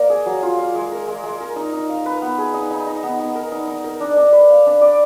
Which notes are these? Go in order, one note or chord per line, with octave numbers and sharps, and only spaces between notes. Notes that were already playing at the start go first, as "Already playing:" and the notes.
Already playing: A#3 A#4 D5
G#4
F#3
F4
F5
G#3
A#4
G#3
G#3
A#4
D#4
D#4
F5
B4
B3
G#4
D#4
D#4
D#5
B3
B3
A#4
D#4
D#4
A#4
D4
D4
B4
F5
D4
D5